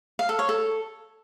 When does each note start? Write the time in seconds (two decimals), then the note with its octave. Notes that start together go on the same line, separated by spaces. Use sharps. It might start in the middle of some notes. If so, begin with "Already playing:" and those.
0.19 F5
0.29 A4
0.39 C#5
0.49 A4